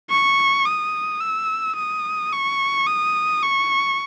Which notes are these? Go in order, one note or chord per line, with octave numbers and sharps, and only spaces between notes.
C#6
D#6
E6
D#6
C#6
D#6
C#6